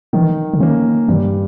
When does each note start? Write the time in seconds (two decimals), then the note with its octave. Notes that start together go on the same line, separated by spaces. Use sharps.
0.13 D#3 E3
0.53 C#3
0.60 D#3 A#3 C#4
1.08 G2 D#3